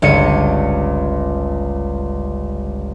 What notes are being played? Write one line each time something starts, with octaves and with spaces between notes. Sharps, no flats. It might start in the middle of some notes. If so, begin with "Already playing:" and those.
G1 C#2 C#7 D#7